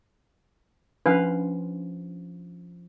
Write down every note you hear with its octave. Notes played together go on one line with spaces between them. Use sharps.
F3 C#4 D4 B4 F5 D#7